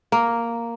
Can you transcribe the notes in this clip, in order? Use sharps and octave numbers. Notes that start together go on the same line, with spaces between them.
A#3